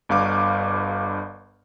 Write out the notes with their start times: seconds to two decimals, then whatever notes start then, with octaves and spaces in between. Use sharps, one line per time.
0.09 G1 G2 F5 D6